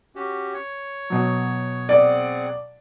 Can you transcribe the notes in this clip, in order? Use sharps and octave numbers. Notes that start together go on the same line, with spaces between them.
C#4 F#4 G4
C#5
B2 F#3
C4 G#4 D5 F#5